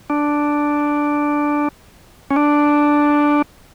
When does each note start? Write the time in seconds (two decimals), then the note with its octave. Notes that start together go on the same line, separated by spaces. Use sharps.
0.10 D4
2.31 C#4
2.36 D4